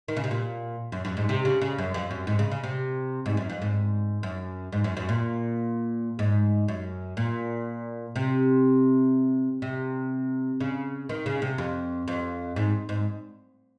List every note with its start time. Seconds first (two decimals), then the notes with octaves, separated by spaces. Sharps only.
0.08 D#3
0.17 C#3
0.24 C3
0.31 A#2
0.92 F#2
1.05 F#2
1.17 G#2
1.29 C3
1.45 C#3
1.62 C#3
1.78 F#2
1.94 F2
2.11 F#2
2.27 G#2
2.39 C#3
2.51 C#3
2.63 C3
3.26 G#2
3.37 F#2
3.50 F2
3.62 G#2
4.23 F#2
4.73 G#2
4.84 F#2
4.97 F#2
5.09 A#2
6.19 G#2
6.68 F#2
7.17 A#2
8.16 C3
9.62 C3
10.60 C#3
11.09 D#3
11.26 C#3
11.42 C3
11.58 F2
12.08 F2
12.56 G#2
12.89 G#2